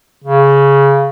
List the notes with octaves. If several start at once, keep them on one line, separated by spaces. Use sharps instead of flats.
C#3